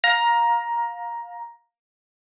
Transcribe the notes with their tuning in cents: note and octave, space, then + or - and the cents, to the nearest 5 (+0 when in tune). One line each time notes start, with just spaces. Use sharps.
F5 +20 A#5 +10